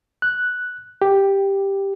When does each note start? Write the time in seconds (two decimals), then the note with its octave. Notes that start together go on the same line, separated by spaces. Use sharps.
0.22 F#6
1.02 G4